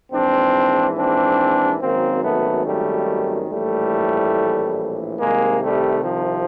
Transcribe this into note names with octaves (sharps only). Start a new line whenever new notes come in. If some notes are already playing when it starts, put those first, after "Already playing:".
A#1 G#2 E3 C4 D4
C4 D4
G#1 F#2 D#3 A#3 C4
A3 B3
G3 A3
A#1 A2 E3 G3 A3
C2 C3 D#3 G#3 A#3
G3 A3
F3